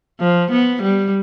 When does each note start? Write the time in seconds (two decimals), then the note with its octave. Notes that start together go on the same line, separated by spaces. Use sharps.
0.20 F3
0.52 B3
0.83 G3